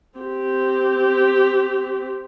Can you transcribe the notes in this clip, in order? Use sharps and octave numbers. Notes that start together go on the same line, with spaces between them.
C4 G4